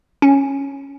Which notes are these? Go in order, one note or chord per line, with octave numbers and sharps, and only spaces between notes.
C#4